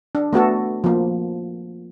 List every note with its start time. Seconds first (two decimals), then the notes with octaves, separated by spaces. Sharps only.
0.15 D4
0.33 A3 B3 F#4 A4
0.84 F3 A#3